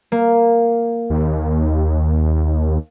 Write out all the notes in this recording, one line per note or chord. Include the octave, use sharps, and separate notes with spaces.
A#3
D#2